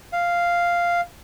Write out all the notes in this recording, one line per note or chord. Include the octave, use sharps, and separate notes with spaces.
F5